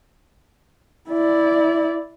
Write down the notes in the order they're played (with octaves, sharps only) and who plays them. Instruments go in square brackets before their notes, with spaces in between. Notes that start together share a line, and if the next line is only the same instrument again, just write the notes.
[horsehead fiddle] E4 D5